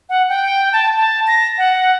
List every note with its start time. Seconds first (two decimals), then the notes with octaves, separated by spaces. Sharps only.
0.09 F#5
0.29 G5
0.73 A5
0.97 A5
1.27 A#6
1.58 F#5